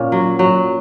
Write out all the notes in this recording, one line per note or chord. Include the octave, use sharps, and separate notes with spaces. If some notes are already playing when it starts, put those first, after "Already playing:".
Already playing: A#2 C#4
F#3
F#3